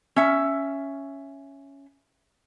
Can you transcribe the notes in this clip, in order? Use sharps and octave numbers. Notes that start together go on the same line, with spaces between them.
C#4 E5